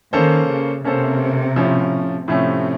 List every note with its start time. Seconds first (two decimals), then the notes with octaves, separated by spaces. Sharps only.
0.13 D#3 A#3 C#4 A4 C5
0.49 C#3
0.84 C3 A#3 C#4 A4 C5
1.56 A2 F3 A3 C#4
2.27 A2 C3 F3 A3 C#4